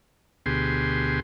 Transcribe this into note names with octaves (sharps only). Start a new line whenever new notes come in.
D2 B2 G4 G#4 C6